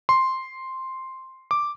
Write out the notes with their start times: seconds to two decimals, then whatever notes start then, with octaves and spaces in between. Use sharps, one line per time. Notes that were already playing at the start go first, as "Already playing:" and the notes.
0.09 C6
1.51 D6